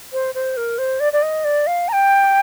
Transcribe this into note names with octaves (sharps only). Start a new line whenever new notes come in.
C5
C5
A#4
C5
D5
D5
D#5
D5
F5
A#5
G5